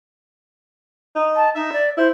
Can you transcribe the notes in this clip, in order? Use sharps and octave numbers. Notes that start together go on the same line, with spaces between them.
D#4
A5
D#4 E5
D5
E4 C5